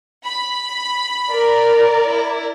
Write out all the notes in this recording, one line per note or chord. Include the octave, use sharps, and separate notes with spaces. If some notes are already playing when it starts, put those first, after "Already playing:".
B5
A#4 D5
E4